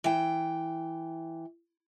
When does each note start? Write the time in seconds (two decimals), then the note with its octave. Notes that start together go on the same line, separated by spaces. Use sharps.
0.04 E3 G5